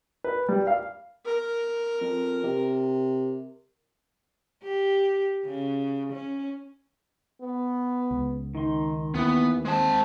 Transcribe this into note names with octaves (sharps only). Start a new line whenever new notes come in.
B4
G3
F5
A#4
F2
C3
G4
C#3
C#4
B3
C#2
D#3 D#4 C6
D#2 E3 B3
G#3 C4 A5